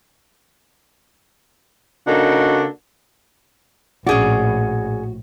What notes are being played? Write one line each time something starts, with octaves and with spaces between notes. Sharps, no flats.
C#3 A#3 D4 D#4 F#4 A4
A#1 A2 C#4 F#4 G#4 D5